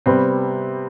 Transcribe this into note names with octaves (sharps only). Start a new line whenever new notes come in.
C3 G3 B3 C4